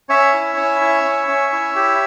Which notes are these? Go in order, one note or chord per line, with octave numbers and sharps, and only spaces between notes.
C#4 C#5 E5
E4
C#4
E4
C#4
C#4
E4
G4